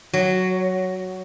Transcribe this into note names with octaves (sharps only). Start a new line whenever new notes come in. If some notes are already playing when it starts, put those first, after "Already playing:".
F#3